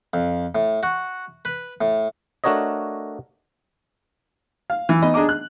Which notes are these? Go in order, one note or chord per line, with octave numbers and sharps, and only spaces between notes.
F2
A2
F#4
B4
A2
A3 D4 F#4 A#4 C#5 D#5
F5
E3
B3 D#4 D#5 B5
D4 G#4 D#5 A#5 D6
F#6